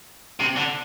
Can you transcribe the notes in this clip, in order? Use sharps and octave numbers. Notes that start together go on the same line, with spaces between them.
C3
D3